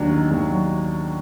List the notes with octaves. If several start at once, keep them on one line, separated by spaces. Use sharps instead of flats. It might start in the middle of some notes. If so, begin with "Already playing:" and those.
Already playing: D#2 F#3 D4
D#3
D#2
F#3